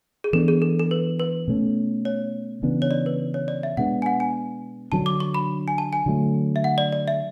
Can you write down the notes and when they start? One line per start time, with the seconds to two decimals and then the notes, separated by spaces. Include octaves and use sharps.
0.24 G#4
0.33 E3 B3 D4 A4
0.48 G#4
0.62 A4
0.79 A4
0.91 B4
1.20 B4
1.48 B2 A3 C#4
2.05 C#5
2.63 C#3 E3 B3 D4
2.82 C#5
2.91 D5
3.06 B4
3.34 C#5
3.48 D5
3.63 E5
3.77 B2 G#3 B3 D4 F#5
4.02 G#5
4.06 F#5
4.20 G#5
4.92 D3 F#3 B3 D4 A5
5.06 D6
5.20 C#6
5.34 B5
5.68 G#5
5.78 A5
5.93 G#5
6.06 D3 F#3 A3
6.56 E5
6.64 F#5
6.78 D5
6.92 D5
7.08 E5